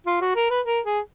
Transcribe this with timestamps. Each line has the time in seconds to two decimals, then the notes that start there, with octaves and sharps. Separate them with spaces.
0.06 F4
0.21 F#4
0.36 A#4
0.50 B4
0.66 A#4
0.85 G#4